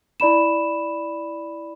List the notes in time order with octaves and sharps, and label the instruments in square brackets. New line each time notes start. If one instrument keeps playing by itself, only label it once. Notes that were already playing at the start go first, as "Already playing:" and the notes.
[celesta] E4 D5 B5 E7